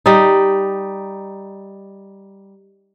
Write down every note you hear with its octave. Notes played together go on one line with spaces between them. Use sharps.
G3 D#4